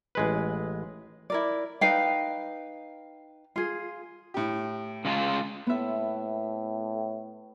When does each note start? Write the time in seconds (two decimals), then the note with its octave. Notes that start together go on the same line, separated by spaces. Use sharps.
0.15 A1 G#3 B4
1.30 E4 A#4 D5
1.81 D#4 B4 F5 G5
3.56 F4 G#4
4.34 A2 G4
5.05 C#3 G#3 F4
5.67 A2 B3 E5